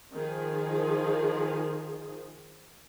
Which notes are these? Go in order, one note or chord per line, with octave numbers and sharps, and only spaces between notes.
D#3 F3 G#4